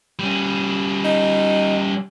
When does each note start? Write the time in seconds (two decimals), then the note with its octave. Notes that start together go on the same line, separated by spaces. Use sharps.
0.19 G3 C#4
1.05 D#4